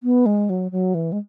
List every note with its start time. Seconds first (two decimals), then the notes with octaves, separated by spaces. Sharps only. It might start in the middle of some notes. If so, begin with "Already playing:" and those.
0.03 B3
0.26 G#3
0.50 F#3
0.72 F#3
0.95 E3
1.12 G#3